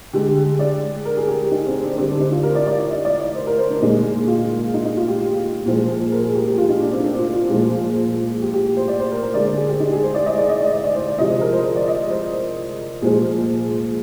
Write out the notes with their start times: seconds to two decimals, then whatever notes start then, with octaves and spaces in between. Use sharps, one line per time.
0.13 D3 G#3 G4
0.59 D5
1.05 A#4
1.17 G#4
1.28 G4
1.51 D#4
1.67 C4
1.82 D4
1.97 D3 G3 C4
2.09 D4
2.20 D#4
2.32 F4
2.43 A#4
2.55 D5
2.67 D5
2.78 D5
2.90 D#5
3.05 D5
3.20 D5
3.35 C5
3.47 A#4
3.59 C5
3.70 D4
3.81 A#2 G#3 D#4
4.28 F4
4.74 D#4
4.85 D#4
4.97 F4
5.08 G4
5.66 A#2 F3 G#3
6.12 A#4
6.23 G#4
6.35 G4
6.46 G4
6.58 F4
6.69 D#4
6.81 D4
6.92 C4
7.04 D4
7.19 F4
7.35 F4
7.50 A#2 F3 G#3
8.42 G4
8.54 G4
8.77 C5
8.88 D5
9.00 C5
9.11 A#4
9.23 A#4
9.34 D3 G#3 D5
9.45 C5
9.57 G#4
9.69 G4
9.80 D#4
9.92 G#4
10.03 C5
10.14 D5
10.26 D#5
10.38 D5
10.49 D#5
10.61 D5
10.72 D#5
10.84 D5
10.95 C5
11.07 D5
11.18 C3 F3 G#3 D#5
11.41 A#4
11.53 C5
11.64 C5
11.76 D5
11.87 D#5
12.10 C5
13.02 A#2 F3 G#3 G#4